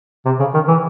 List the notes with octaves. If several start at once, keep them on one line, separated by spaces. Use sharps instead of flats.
C3
C#3
D#3
E3